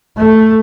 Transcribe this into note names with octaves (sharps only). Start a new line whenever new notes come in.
A3